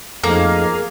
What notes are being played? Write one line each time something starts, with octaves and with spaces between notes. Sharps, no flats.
F2 A3 A#3 C4 D#4 G#4 F5